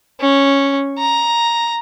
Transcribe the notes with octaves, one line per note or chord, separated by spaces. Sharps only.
C#4
A#5